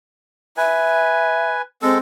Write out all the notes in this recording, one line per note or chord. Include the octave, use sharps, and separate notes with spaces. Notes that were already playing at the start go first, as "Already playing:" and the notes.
B4 E5 G#5
G#3 C4 A4